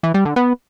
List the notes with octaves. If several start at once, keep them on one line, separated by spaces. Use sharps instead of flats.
E3
G3
D3
B3